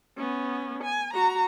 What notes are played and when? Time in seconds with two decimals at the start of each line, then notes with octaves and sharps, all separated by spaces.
0.17 B3 C#4
0.83 G#5
1.13 F#4 A#5